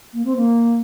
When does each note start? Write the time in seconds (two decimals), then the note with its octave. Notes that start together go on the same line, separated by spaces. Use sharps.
0.13 A#3
0.25 C4
0.36 A#3